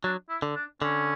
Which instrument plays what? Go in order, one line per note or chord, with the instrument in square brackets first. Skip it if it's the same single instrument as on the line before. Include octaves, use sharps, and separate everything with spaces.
[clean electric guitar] F#3 [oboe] D4
[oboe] E4
[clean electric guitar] D3
[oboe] D4
[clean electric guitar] D3 [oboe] C#4